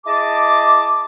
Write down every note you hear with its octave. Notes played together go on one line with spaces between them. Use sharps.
E4 G#4 D#5 A5 D6